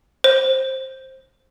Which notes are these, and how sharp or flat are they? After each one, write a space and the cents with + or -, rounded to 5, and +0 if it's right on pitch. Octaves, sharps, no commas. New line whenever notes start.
C5 +15